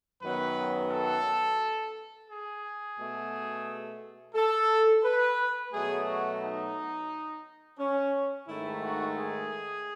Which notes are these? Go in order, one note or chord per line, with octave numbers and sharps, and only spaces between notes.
F#2 D#3 F#3 B3 B4
A4
G#4
B2 A3
A4
B4
B2 F#3 A3 G#4
F#4
D#4
C#4
G#2 D#3 A3 E4
F#4
G#4